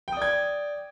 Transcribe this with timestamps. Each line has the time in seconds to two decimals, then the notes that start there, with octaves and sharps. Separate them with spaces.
0.08 G5
0.12 D#6
0.17 D5
0.22 G#6